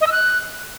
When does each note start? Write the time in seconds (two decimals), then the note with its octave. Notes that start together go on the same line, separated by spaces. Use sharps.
0.01 D#5
0.06 E6
0.12 F#6